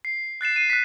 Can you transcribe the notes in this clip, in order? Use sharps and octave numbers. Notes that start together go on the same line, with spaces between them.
C7
F#6 A6 C7 E7
C7 D#7
F#6 B6